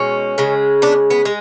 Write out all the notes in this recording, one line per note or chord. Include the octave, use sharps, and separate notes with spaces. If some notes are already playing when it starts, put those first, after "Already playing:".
Already playing: B2 G#3 C#4
C#3 G#3
B3 D4
B3
G#3